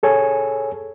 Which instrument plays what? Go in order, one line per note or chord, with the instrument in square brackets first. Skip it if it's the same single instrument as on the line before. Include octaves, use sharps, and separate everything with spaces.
[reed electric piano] G#4 A4 C#5 G#5